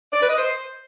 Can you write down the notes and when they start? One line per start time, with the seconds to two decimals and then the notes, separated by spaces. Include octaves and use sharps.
0.13 D5
0.21 B4
0.29 D#5
0.38 C5